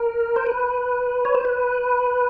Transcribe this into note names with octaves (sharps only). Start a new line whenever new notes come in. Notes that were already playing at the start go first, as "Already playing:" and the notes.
Already playing: A#4
C5
B4
C#5
C5
B4